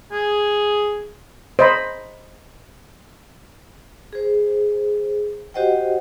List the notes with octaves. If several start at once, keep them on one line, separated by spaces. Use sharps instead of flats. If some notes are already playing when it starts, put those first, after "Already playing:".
G#4
C5 D#5 B5
G#4 C5
F#4 G4 C5 D#5 F#5 G5